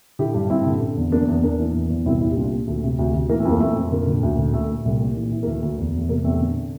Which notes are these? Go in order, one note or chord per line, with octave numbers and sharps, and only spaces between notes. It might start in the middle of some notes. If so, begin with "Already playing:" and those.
D3 E4 G4
G2
G2 C4 E4
D3
D3
E2
E2 A#3 D4
E2
E2 A#3 D4
E3
E2
E2
C2 C4 E4
A#2 C4 E4
G4
C2 D4 F4
A#2
D2 A3
C3
D2
D2
E3 A#3
A3
F2
A#3
F2 A3
F2
D3 A#3
D3
D2
D3
A#2 A3
A#2
C2 A3
A#2
E3
E3
A#3
D2 A3
D2
E2
E2 A3
C3 A#3
E2 A3 C4
D3